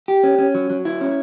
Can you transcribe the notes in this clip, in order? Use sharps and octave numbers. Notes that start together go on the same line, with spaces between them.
G4
C#4
C#4
F#3
F#3
E4
C#4